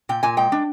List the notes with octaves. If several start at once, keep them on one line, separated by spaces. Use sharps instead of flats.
A#2 G5
A#2 G#5
G#3 G5
D4